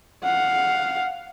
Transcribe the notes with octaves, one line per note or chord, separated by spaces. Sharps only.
F5 F#5